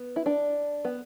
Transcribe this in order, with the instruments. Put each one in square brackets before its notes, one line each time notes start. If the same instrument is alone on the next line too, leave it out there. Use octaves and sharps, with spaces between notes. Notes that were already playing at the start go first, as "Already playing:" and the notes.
Already playing: [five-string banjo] B3
E4
D4
B3